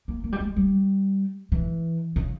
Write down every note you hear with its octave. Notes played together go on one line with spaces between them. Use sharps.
A#3
A#3
G3
G#3
G3
E3
C#3